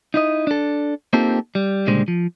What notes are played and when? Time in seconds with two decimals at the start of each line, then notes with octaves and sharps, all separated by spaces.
0.14 D#4 E4 D#5
0.47 D4 A4
1.13 A#3 C4 D#4 F4 G4 A4
1.55 G3
1.87 C#2 A#2 D3 G3 G#3 C5
2.08 F3